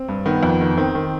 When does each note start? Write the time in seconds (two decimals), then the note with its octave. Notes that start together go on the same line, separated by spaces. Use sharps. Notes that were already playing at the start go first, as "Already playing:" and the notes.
Already playing: C4
0.09 G2
0.26 D#3 B3
0.43 F2
0.61 D#3
0.77 D#3 C4
0.95 D#3